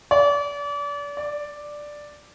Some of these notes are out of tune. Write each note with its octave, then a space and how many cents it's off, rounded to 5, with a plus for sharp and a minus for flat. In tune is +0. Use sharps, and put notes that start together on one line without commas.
D5 -35
D5 +5